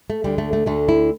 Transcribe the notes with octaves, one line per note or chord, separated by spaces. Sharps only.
A3
D2 D3 G3
A3
A3
D2 D3 A3
E4